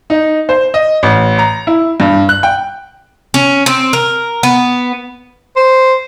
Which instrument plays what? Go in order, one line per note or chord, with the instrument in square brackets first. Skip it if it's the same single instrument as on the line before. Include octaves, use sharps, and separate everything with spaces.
[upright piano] D#4
C5
D#5
A1
A#5
E4
G2
F#6
G5
[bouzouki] C#4
C4
A#4
B3
[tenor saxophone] C5